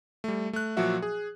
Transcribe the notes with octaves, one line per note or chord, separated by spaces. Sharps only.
G3 A3
A3 F#6
A#2 F3 F#3 F#4 E5
G#4